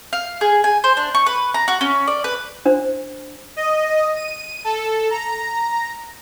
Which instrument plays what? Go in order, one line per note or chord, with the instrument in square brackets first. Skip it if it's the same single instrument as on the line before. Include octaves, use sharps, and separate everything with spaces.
[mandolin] F5
G#4
G#5
C5
D4
C#6
B4
A#5
F#4
C#4
D5
B4
[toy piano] D4 C5
[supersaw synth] D#5
D#7
A4
A#5